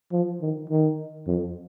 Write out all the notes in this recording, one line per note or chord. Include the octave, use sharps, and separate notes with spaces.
F3
D#3
D#3
F2